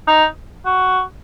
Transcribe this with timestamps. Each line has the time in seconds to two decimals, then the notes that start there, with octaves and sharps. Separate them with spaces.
0.07 D#4
0.65 F#4